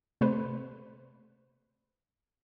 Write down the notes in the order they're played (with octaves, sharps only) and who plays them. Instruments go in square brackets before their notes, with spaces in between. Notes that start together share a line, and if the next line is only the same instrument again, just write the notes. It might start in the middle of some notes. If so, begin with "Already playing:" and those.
[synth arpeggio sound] C3 A3 B4 C5